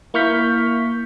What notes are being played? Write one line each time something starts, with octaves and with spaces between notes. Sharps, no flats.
A#3 E4 C#6 F6 G6 B6